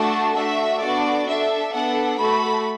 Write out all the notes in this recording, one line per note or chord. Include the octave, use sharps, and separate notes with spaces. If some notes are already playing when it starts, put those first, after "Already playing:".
Already playing: A3 D4 F#4 A4 A5
A3 D4 F#4 E5
B3 D4 F#4 A4 D5
D4 A4 E5
B3 D4 A4 F#5
A3 F#4 A4 B5